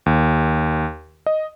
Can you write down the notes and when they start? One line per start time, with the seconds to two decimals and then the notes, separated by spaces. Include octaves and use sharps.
0.06 D#2
1.26 D#5